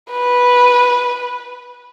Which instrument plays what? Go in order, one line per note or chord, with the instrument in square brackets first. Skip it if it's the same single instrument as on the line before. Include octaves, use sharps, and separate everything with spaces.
[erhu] B4